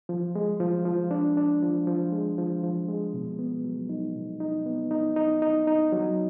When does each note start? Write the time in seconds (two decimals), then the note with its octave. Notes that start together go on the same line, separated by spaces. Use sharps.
0.09 F3
0.35 G#3
0.60 F3
0.85 F3
1.11 D4
1.37 D4
1.62 F3
1.87 F3
2.12 G#3
2.38 F3
2.63 F3
2.88 G#3
3.13 B2
3.39 B3
3.65 F#3
3.89 D#4
4.16 B2
4.40 D#4
4.66 B3
4.91 D#4
5.16 D#4
5.42 D#4
5.67 D#4
5.92 F#3